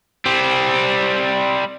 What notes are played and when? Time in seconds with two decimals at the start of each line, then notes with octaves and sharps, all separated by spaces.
0.26 G3 C4